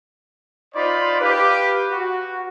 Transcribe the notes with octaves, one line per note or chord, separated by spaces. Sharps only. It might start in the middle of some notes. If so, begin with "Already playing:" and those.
D#4 F4 C5 D5 D#5 B5
G4 B4 F5
F#4